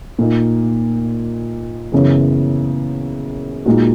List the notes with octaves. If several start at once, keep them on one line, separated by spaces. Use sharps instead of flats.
A#2 A#3 D#4
F#2 C#3 E3 B3
A#2 G#3 D#4 F#4